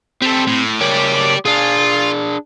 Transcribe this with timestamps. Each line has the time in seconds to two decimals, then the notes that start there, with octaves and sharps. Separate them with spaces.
0.22 G3 C4 A4
0.47 A2
0.81 C#3 G4 A#4 C#5 D5
1.45 D4 F4 G#4